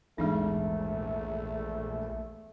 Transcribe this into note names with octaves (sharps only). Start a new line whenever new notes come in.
A#1 E2 G#2 E3 G#3 A3 D4 D#4